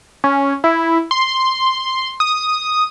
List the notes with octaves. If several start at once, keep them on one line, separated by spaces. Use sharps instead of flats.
C#4
E4
C6
D#6